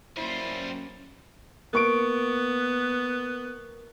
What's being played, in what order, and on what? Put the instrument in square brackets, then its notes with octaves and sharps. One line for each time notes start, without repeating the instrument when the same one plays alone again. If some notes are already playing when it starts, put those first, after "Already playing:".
[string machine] F#3 A#3 C#4 [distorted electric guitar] G3 F4 [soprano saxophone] E4 [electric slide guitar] C5
[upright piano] A#3 C#6 D7 [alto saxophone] B3